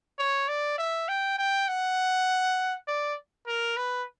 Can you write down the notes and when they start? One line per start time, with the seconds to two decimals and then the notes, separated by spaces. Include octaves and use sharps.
0.18 C#5
0.48 D5
0.78 E5
1.08 G5
1.38 G5
1.68 F#5
2.87 D5
3.47 A#4
3.77 B4